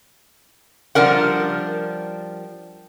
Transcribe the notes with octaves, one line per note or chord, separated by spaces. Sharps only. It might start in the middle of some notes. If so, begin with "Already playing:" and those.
F3 G3 D4 A#4 F#5